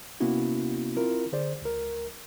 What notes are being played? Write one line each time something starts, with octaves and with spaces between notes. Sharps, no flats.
C3 A#3 B3 C#4 E4 F#4
C4 E4 F4 A#4
D3 G#4 C5 D5
C#2 A#4